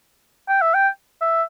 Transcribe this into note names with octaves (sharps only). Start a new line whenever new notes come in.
G5
E5
G5
E5